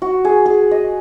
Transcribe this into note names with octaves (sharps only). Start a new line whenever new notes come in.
F#4
G#4
G#4
D#5